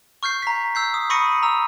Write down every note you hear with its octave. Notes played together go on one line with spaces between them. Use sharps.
C#6 F6 G6 C7
A#5 B6
E6 G6 C7
D#6
B5 C#6 D#6 A#6 C#7 D#7
A#5 E6